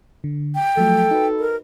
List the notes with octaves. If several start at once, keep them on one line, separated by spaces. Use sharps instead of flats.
D3
G5
F3 F#3 A3 A4
D#4 F#4 B4
A#4